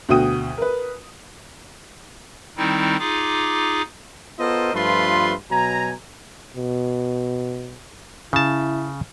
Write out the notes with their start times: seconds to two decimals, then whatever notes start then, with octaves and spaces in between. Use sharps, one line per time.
0.09 D2 B2 F#4 G5 D#6 D#7
0.58 A#4 B4
2.57 D#3 G3 C4 D#4 E4
2.99 D#4 F4 G#4 D6
4.39 B3 F4 A4 A#4 C5 D#5
4.74 G2 F3 A3 F4 B4 C6
5.51 B2 F#3 G#5 A#5
6.56 B2
8.33 C#3 E4 A5